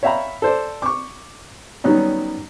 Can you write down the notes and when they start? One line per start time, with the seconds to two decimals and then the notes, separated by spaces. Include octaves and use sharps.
0.03 C#5 E5 F5 G5 A#5 B5
0.42 A4 C5 D5
0.82 C#6 D6
1.84 D#3 F#3 G3 B3 C#4 D#4